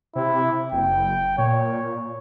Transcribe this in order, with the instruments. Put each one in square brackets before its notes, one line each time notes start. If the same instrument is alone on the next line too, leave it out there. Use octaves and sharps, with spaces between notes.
[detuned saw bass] C3 [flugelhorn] E4
[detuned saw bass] F#1 [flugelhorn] G5
[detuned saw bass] A#2 [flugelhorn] C#5